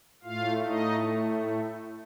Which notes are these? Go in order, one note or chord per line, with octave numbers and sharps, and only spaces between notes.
A2 A3 F4 F5
D#4 D#5